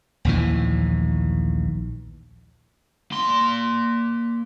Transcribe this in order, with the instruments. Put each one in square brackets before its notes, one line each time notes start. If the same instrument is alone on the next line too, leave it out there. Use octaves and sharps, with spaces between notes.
[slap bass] A#1 D#2 A2 E3
[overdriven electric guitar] A#3 C6